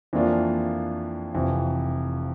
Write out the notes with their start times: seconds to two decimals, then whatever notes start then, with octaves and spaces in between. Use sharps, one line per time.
0.13 F2 E3 A#3 D4 F4
1.34 F1 F2 E3